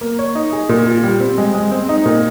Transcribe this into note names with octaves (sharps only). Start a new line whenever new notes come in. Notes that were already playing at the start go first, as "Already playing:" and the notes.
A#3
C#5
D#4
G#4
A#2
F4
G3
C4
G#3
G#3
C4
D#4
A#2